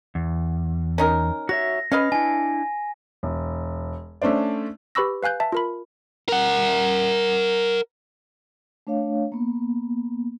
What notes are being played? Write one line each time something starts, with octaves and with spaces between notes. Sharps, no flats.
E2
C#4 D#4 A#4
F#4 C#5 E5 A#6
C#4 B4 D#5 F5
D4 E4 G#5
E1
A3 C#4 D4 C5 D5
G4 B4 B5 C#6 E6 A#6
B4 F5 G#5 F#6 G6
E5 A5
F4 A#4 B5
A#4 F#5
A3 D4 C#5 F5
A#3 B3